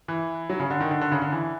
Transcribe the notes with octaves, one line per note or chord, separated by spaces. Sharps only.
E3
F#3
C#3
D3
D#3
D3
D3
C#3
D3
E3